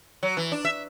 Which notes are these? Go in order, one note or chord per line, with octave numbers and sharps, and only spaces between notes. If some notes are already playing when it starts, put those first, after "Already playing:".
F#3
E3
D4
E5